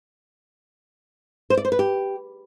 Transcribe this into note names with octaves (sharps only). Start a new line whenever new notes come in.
C5
D5
C5
B4
G4